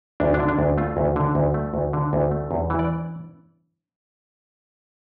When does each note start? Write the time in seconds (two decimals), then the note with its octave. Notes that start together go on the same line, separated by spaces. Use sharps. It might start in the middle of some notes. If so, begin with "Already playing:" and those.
0.20 D2 D4
0.34 D4
0.40 D3
0.48 D4
0.59 D2
0.78 A3 F4
0.97 D2
1.16 D3
1.35 D2
1.54 A3
1.74 D2
1.93 D3
2.13 D2
2.31 A3
2.51 E2
2.70 E3
2.79 D5